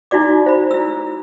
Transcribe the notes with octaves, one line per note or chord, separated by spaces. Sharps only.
D#4 E4 F#4 D5 D6
C5 B5
E4 E6